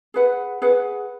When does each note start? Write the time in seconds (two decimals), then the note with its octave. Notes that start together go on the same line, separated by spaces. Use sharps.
0.14 G#4 B4 F#5
0.62 G#4 B4 F#5